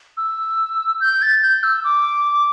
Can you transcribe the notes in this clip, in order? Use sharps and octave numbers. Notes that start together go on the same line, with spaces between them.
E6
G6
A6
G6
E6
D6